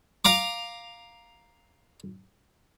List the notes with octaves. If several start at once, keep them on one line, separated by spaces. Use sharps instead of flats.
F5 A#5 D6